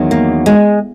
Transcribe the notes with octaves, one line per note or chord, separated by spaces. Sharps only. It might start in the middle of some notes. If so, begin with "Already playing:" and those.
Already playing: E2 D#3 F#3
A#3
G#3